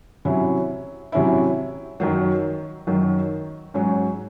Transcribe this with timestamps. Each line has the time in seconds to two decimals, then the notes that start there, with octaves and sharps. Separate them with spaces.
0.25 C3 F#3 C#4 E4
1.12 C3 F#3 C#4 E4
2.00 F#2 D#3 F#3
2.87 F#2 D#3 F#3
3.74 G#2 F#3 C#4 F#4